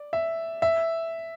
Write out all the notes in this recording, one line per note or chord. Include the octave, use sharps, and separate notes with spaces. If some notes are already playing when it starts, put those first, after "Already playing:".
Already playing: D5
E5
E5